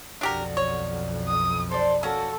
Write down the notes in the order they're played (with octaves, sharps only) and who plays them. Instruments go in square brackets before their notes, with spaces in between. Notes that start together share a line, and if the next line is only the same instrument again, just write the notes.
[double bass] B1 F2 [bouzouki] D3 F#4 [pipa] D4 G4 A#4
[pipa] C#5
[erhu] D#6
[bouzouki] A4 D5 [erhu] C5
[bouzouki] A#3 F#4 [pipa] C#4 [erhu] A4